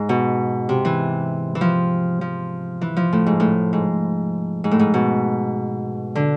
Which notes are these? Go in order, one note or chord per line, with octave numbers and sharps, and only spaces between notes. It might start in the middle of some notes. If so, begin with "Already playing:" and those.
Already playing: G#2
B2
C3
E3
E3
F3
F3
E3
F3
A2
G#2
A2
G#2
G#2
A2
G#2
B2
D3